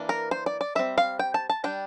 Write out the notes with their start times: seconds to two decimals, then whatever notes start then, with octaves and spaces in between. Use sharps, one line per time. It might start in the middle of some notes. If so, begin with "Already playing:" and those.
Already playing: E3 A#3 D4
0.09 A#4
0.31 C5
0.46 D5
0.61 D5
0.75 G3 C4 E5
0.98 F5
1.19 G5
1.34 A5
1.50 A5
1.64 G3 D4 G5